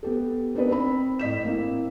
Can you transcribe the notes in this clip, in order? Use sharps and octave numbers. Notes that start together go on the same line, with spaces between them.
B3 G4 A4
B3 C4 D4 D#4 A#4 B4
C4 B5
A2 D#5 B6 E7
A#3 C4 E4